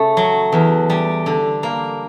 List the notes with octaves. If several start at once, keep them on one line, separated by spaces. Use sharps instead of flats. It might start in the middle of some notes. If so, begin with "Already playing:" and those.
Already playing: C#3 A3
F#3
E2
G3
D3
A#3